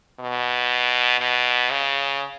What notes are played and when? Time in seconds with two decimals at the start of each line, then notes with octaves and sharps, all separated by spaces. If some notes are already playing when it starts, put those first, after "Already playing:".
0.20 B2
1.21 B2
1.71 C#3